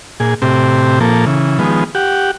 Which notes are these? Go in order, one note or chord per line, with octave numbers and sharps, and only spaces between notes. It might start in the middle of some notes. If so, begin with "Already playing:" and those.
A#2 G#4
A2 C3 C4 G4
A#2 F3 A#3 A4
C#3 E3
D#3 F3 G#3 B3
G4 F#5